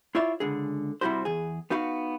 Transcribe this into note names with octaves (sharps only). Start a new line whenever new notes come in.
E4 F4 C#5 D5 E5
C#2 D3 G#4
C3 G3 E4 F#4 C5
E2 G#4
B3 D#4 F#4 F5